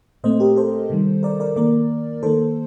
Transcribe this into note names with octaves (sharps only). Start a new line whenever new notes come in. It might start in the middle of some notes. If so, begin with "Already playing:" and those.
A#2 A3 C4 C5 D#5
G4 A#4
A4 C5
C3 D#3 G3
A#4 D5
A#4 D5
D#3 A#3 A#4 D5
D#3 A#3 A4 C5